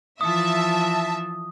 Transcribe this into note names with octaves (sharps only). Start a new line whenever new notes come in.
E3 F3 E5 A5 D#6